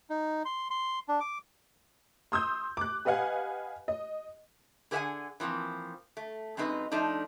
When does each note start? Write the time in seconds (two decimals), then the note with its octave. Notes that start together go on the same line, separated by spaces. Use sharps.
0.10 D#4
0.45 C6
0.70 C6
1.08 D4
1.20 D6
2.32 C6 D#6 E6 G6
2.77 D6 F#6
3.05 G4 B4 D#5 F5 F#5 G#5
3.88 D#5
4.91 D3 G#4 B4 E5 F#5 G#5
5.40 E3 F3 A#3 C4
6.17 A3
6.57 F#2 G#3 C4 D#4 B4
6.91 F3 A3 D4 D#4